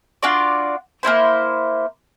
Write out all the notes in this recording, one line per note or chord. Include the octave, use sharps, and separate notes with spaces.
D4 F4 F#4 D5
A#3 C4 E4 C5